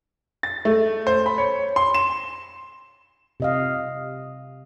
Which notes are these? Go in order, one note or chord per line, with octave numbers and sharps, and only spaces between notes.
A6
A3
C5
B5
C#5
C6
E7
C3 D#5 F5